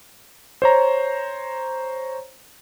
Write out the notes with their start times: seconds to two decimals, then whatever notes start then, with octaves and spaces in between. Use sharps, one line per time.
0.62 C5 C#5 A#5